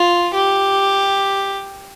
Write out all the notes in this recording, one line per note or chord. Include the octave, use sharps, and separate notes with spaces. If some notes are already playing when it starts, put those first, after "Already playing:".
Already playing: F4
G4